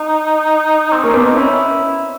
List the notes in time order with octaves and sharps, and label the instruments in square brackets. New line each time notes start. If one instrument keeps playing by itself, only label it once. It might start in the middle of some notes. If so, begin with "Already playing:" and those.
Already playing: [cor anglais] D#4
C4
[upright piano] A#3 [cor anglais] C#4
[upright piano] B3 [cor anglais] D4
[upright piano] C4 [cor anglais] D#4
[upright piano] C#4 [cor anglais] E4